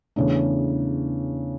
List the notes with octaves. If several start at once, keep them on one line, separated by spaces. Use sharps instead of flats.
E2 C#3 E3 A3 D4